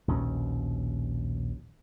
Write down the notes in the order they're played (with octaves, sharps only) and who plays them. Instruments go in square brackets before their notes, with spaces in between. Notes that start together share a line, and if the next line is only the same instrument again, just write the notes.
[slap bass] A#1 D#2 B2 C#4